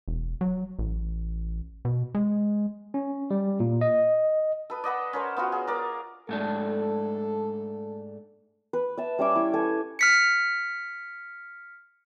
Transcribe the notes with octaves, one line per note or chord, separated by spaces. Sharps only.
E1
F#3
A1
B2
G#3
C#4
G3
A#2
D#5
A4 B4 D#5
D5 D#5 F#5 B5
C#4 A#4 C5
B3 F4 F#4
G#4
A#4 D5
G#2 A3 D4 A4
B4
E5 A5
G3 C#4 E5 D6
E4
A4 G#5
F6 B6 C#7